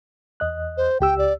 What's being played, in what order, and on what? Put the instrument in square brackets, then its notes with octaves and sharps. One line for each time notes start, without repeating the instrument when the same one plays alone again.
[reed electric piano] E2 D#5 F#6
[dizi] C5
[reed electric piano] C#2 G4 E6 [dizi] G5
[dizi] D5